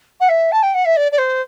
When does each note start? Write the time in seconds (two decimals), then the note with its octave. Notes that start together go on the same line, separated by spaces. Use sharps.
0.20 F#5
0.29 E5
0.52 A5
0.63 G5
0.74 F#5
0.85 E5
0.97 D5
1.12 D5
1.18 C5